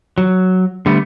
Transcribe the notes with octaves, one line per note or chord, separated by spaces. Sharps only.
F#3
D3 G3 A3 B3